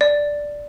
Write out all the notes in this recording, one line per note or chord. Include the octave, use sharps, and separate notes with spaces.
D5